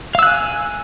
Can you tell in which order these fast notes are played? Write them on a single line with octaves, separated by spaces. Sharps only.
F5 E6 F#6 G#5